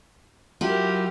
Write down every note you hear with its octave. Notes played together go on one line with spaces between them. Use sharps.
F#3 E4 F4 G4 A#4